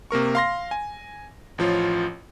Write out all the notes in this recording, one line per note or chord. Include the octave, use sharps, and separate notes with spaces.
C3 A#3 A#4 C#6
F5 C6 A#6
G#5
A1 F3 F4 C#5